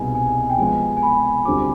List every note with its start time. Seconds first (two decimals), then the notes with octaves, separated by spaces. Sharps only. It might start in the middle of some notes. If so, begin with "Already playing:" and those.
Already playing: C2 B2 B3 D#4 G#4 G#5
0.15 G#5
0.50 G5
0.58 F3 G#3 B3 G#5
0.97 G#5
1.03 B5
1.45 D2 D3 G3 C4 F4 D6